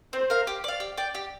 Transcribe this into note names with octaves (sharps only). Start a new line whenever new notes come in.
C4 C5
A#4 F5
G4
D5 F5
G4
D5 G5
G4